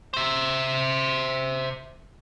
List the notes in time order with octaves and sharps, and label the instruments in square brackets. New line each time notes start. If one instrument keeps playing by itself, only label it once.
[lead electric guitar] C5 E5